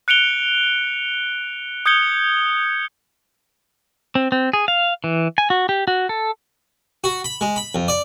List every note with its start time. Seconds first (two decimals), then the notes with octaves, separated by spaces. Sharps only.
0.08 F#6 C#7 D7 F7 G7
1.86 D#6 G6 G#6 C#7 G7
4.15 C4
4.32 C4
4.53 G#4
4.68 F5
5.04 E3
5.38 G#5
5.50 F#4
5.69 G4
5.88 F#4
6.09 A4
7.04 F#4
7.24 B5
7.41 G#3
7.56 B5
7.75 F2
7.88 D5